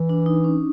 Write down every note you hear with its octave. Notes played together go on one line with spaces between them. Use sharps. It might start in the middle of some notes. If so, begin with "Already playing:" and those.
Already playing: E3
D4
D#4
C#4